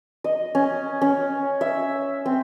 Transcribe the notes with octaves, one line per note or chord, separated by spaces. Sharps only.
D#5
C#4
C#4
E5
C4